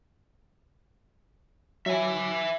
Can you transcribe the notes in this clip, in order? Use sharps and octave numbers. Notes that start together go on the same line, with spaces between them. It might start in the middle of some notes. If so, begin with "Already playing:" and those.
F#3 E5 G#5